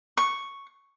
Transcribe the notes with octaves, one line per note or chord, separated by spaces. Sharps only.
C#6